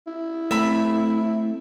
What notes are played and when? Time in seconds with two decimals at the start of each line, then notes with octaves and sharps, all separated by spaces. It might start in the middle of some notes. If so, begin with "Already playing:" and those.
0.07 E4
0.51 A3 C4 E5 B5